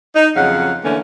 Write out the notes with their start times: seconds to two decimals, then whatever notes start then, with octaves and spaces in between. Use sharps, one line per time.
0.15 D#4
0.36 F2 C#3 F#3 F5 F#5
0.84 D3 E3 A3 A#3 C#4